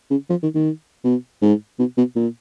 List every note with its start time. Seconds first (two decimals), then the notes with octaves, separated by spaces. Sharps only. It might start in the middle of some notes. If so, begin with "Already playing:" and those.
0.10 C#3
0.30 F3
0.43 D#3
0.55 D#3
1.04 B2
1.42 G#2
1.79 B2
1.97 B2
2.16 A#2